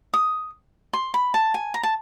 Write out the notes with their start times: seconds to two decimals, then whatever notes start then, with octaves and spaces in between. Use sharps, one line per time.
0.14 D#6
0.93 C6
1.14 B5
1.34 A5
1.54 G#5
1.74 A#5
1.83 A5